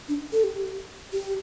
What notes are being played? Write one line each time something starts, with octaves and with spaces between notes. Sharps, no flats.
D4
A4
G4
G4